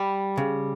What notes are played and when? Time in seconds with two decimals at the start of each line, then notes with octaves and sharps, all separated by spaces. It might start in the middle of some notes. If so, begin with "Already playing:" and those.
Already playing: G3 B5
0.37 C#3